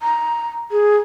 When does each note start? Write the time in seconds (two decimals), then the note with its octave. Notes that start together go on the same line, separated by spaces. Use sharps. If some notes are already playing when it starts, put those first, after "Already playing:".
0.02 A#5
0.72 G#4